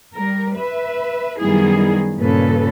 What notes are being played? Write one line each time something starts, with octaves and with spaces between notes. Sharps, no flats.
G3 A#4
B4 E5
F#2 D#3 G3 B3 E4 G#4
G2 A#2 C#3 C#4 A4 B4